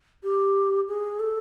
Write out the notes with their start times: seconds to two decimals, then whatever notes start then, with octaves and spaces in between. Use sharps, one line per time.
0.23 G4
0.88 G#4
1.20 A4